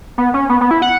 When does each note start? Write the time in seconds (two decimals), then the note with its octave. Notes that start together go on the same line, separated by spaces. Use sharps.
0.18 B3
0.34 C#4
0.49 B3
0.61 B3
0.71 E4
0.82 F#5